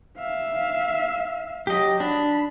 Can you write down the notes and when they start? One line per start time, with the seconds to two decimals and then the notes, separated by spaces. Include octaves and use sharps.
0.18 E5 F5
1.67 F#3 G4 D#5
2.00 D4 B5